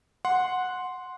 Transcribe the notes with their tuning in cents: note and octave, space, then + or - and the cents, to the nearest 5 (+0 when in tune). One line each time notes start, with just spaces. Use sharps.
F#5 -10 C6 +0